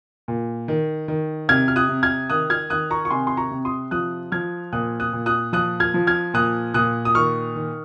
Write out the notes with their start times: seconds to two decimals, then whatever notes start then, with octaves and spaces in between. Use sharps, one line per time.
0.28 A#2
0.68 D#3
1.08 D#3
1.49 C3 F6 G#6
1.68 F6
1.76 D#6 F#6
1.89 C3
2.03 F6 G#6
2.30 D#3 D#6 F#6
2.50 F6 G#6
2.70 D#3 D#6 F#6
2.91 A#5 C#6
3.05 C#6
3.10 C3 G#5 C6
3.27 C6
3.37 A#5 C#6
3.51 C3
3.65 C6 D#6
3.91 F3 D#6 F#6
4.32 F3 F6 G#6
4.73 A#2 D#6 F#6
5.00 D#6 F#6
5.13 A#2
5.26 D#6 F#6
5.53 F3 D#6 F#6
5.80 F6 G#6
5.94 F3
6.07 F6 G#6
6.34 A#2 D#6 F#6
6.74 A#2 D#6 F#6
7.05 D#6
7.15 D#3 C#6 F6
7.56 D#3